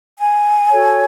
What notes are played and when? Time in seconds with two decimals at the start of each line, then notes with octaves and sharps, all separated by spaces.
0.18 G#5
0.70 F#4 A4 C#5